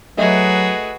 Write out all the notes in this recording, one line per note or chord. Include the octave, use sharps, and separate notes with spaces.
F#3 A3 F#4 G#4 B4 D#5 E5